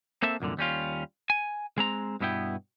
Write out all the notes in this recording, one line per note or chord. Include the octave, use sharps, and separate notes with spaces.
A#3 C4 A4 E5
C2 F#2 A#2 D3
D#2 G3 C#4 F4
G#5
G#3 C4 A#5
G2 B2 B3 E4 G5